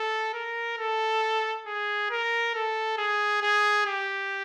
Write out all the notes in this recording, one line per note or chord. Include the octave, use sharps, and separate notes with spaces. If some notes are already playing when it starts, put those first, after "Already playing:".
Already playing: A4
A#4
A4
G#4
A#4
A4
G#4
G#4
G4